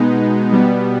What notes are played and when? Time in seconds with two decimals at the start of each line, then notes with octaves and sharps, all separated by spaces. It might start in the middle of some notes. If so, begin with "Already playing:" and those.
Already playing: B2 G#3 B3 D#4
0.51 B2 G3 B3